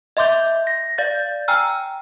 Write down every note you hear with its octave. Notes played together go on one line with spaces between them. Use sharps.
D#5 E5 C6 D6 G6
A#6
D5 F5 G6 A6
G5 G#5 A#5 E6 F6